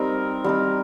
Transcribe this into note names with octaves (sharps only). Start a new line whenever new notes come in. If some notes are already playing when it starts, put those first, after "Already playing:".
Already playing: G3 C4 D#4 A#4
G3 C4 D#4